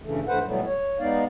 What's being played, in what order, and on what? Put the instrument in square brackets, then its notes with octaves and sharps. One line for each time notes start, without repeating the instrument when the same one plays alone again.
[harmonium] G2 C#3 E3 A3
G2 E3 A3 B4 C5 F#5
B2 E3 F#3 G3 A3 B3
C#5
G#3 B3 D#4 D5 F5